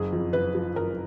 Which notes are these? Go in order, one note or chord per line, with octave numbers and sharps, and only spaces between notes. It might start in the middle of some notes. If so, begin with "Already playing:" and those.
Already playing: F#1 G#4
F2
F#1 B4
F3
F#1 A#4